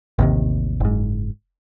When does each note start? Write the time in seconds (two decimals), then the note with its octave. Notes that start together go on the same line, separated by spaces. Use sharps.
0.18 A1 D#2 C3
0.80 F#1 G#2